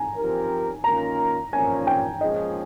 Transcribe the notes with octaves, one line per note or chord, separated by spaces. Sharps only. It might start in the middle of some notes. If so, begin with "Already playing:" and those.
Already playing: G#5 A#5
F3 C4 G4 A#4
D#3 A#3 C#4 F4 A#4 A#5
A#2 F3 A#3 C#4 G#5
G5
A#2 F3 G#3 C#4 G#4 D#5